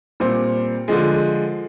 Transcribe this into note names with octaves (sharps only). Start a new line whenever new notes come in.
A#2 G3 C4
D3 F3 G#3